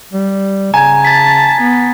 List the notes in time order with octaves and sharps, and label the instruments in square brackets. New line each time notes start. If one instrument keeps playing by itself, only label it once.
[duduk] G3
[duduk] C#3 [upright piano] G#5 [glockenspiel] A#5 G#6
[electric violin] A5 [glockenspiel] A6 B6
[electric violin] B3